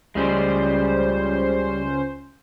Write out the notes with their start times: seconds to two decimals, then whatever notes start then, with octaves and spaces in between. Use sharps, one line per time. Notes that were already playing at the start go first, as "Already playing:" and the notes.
0.15 C#2 G3 G#3 C#4 C5